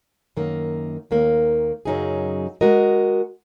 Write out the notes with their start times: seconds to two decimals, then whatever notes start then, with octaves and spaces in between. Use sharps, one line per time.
0.37 F#2 D#3 A#3
1.11 D#2 D#3 A#3
1.85 F#2 C#3 F#3 D#4 G#4
2.61 G#3 F#4 A#4 D#5